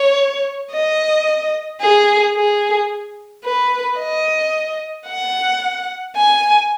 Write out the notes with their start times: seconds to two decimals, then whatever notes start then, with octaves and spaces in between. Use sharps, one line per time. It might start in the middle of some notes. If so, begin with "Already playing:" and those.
Already playing: C#5
0.71 D#5
1.81 G#4
2.36 G#4
3.44 B4
3.99 D#5
5.07 F#5
6.16 G#5